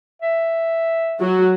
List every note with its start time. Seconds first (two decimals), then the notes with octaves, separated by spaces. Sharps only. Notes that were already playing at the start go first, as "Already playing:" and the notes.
0.22 E5
1.20 F#3 F#4